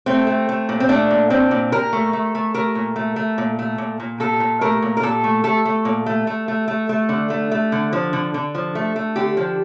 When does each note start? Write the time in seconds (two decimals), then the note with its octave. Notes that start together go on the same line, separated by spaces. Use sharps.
0.06 A3 C4
0.27 A3
0.49 A3
0.69 A#2
0.80 C4
0.89 A3 D4
1.11 A#2
1.30 A#2 C4
1.51 A#2
1.72 A#2 A#4
1.93 A3
2.13 A3
2.35 A3
2.54 A3 A#4
2.75 A#2
2.96 A3
3.16 A3
3.38 A#2
3.59 A3
3.78 A#2
4.00 A#2
4.20 A#2 A4
4.40 A#2
4.61 A3 A#4
4.83 A#2
4.97 A#4
5.03 A#2 A4
5.24 A3
5.44 A3 A4
5.65 A3
5.85 A#2
6.06 A3
6.27 A3
6.48 A3
6.68 A3
6.89 A3
7.09 D3
7.30 A3
7.52 A3
7.72 D3
7.93 F3
8.13 D3
8.34 D3
8.55 F3
8.75 A3
8.96 A3
9.16 D3 G4
9.37 F3